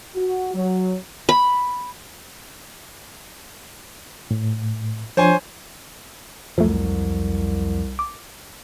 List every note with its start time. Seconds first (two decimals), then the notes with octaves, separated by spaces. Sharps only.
0.15 F#4
0.54 F#3
1.29 B5
4.31 A2
5.17 F3 D4 C5 C#5 G#5
6.58 C2 F2 F3 F#3 A3
7.99 D6